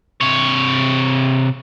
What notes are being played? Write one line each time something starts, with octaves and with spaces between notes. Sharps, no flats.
C3 C#5